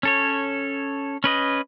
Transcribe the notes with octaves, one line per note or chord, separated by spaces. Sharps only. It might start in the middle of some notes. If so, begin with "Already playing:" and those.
C#4 A4 C#5
C#4 B4 D#5